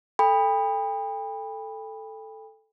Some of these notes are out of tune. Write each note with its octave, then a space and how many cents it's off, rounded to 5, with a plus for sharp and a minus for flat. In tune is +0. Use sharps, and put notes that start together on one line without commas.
A4 +0 G5 +40 B5 +0